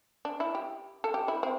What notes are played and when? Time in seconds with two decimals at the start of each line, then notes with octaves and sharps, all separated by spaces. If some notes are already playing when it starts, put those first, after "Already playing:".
0.25 D4
0.40 E4
0.55 G4
1.04 A4
1.14 G4
1.28 E4
1.43 C4